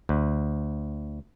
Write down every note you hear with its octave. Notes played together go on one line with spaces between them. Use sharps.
D2